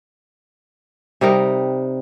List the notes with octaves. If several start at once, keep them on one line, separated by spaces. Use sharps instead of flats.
C3 G3 D#4 A#4